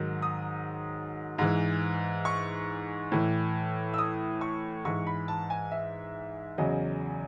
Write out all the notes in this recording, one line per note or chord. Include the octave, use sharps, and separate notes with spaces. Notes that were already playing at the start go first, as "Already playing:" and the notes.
Already playing: G#2 D#3 F#3
D#6
G#2 E3
C#6
A2 E3
E6
D#6
C#6
G#2 E3 C#6
B5
A5
G#5
E5
E2 C#3 F#3 D#5